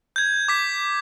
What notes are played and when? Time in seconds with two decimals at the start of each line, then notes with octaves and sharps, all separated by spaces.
0.16 G6 G#6
0.48 D6 B6